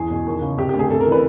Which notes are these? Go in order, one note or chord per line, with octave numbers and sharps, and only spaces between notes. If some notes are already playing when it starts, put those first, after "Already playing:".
Already playing: E2 G#4
B2
D#2
C#3
C3 G4
G4
D2
G#4
C3 A4
A#4
E3
B4